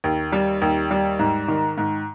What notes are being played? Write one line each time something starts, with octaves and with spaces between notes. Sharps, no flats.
D#2
G3
D#2
G3
G#2
D#3
G#2